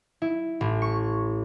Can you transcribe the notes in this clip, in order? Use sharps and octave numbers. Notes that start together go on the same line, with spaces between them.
E4
A1
C#6